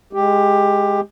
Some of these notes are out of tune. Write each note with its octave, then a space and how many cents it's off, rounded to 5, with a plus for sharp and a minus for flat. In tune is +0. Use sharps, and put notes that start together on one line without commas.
G#3 +0 G4 +15